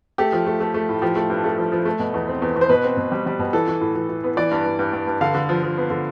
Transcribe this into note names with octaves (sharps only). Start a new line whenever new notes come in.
A3 G4
F3
A3
A3
A3
A2
F3 G4
A3
G2
A3
F3
F3
A3
B2
E2
C4
E2
E2
C5
B2 B4
C4
B2
G3
G3
B2
E3 A4
E3
A2
E3
E3
B3
E3 D5
G2
G2
G2
G2
G2
D3 F5
D3
F3
F3
B3
D3